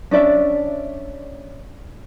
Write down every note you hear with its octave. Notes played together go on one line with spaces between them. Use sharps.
C#4 D4 D5 E5